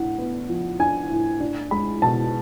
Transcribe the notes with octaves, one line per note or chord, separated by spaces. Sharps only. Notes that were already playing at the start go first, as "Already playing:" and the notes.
Already playing: A2 D4 F#5
B3
F3
D4 G#5
A2
D4
G#3 B5
B2 A5